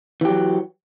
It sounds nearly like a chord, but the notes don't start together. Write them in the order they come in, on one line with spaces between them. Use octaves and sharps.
E3 G4 F#3